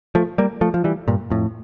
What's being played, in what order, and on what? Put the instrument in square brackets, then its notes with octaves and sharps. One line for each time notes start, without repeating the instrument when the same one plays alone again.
[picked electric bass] F3 A3
G3 A#3
F3 A3
F3
E3 G3
G2 A#2
F2 A2